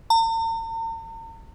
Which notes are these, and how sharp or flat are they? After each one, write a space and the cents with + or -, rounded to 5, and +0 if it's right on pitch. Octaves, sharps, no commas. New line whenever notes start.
A#5 -45